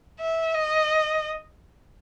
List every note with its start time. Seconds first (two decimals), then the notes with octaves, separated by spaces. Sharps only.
0.20 E5
0.55 D#5